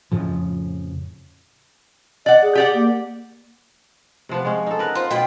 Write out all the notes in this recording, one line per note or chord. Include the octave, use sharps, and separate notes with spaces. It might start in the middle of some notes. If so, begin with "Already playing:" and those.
F2 A2 C#3 F3
D5 D#5 F#5
G#4
G4 D5 F#5
A#3
C3 F3 B3
G#3 C#4
D#4 A4
B3 A#4 B4
F4 C5
B2 F4 B4 G5